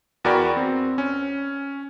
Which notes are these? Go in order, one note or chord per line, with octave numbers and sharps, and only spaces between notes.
E2 F#4 A#4 D5 G5 B5
C4
C#4